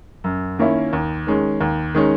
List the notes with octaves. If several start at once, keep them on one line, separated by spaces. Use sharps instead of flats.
F#2
D#3 A#3 C#4 E4
D#2
D#3 G#3 C#4
D#2
D#3 G#3 C#4